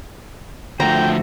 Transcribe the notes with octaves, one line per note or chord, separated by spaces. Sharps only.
D3 F3 A3 F#4 C5 G5 A#5